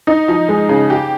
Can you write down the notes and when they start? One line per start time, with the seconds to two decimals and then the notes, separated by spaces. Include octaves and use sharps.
0.07 D#4
0.28 F3
0.49 G#3
0.69 C#3
0.90 G4